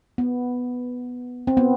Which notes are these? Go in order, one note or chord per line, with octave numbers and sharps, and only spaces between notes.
B3
C4
B3